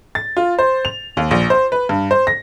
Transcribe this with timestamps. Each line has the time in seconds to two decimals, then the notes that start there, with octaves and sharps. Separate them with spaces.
0.15 A6
0.37 F4
0.59 C5
0.85 F7
1.17 D#2
1.31 A#1
1.50 C5
1.72 B4
1.89 G2
2.11 C5
2.27 A#6